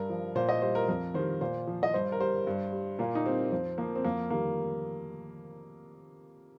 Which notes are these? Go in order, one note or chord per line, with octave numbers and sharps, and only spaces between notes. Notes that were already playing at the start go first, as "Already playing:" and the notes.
Already playing: G2 A#4
F3
A#2 C5
D#5
G3 C5
A#4
F2 A#4
D#3 G3 C5
A#2 C5
F3
D#5
G2 C5
A#4
G3 C5
G2
G3
A#2 A#3
D#4
G3 C4
F2 C4
F3 A#3
C4
F2 A#3
D#3 G3 A#3